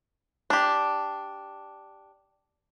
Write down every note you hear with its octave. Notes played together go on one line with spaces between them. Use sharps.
D4 G4